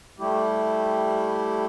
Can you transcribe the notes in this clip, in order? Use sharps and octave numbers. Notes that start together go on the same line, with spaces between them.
G3 A3 E4 G4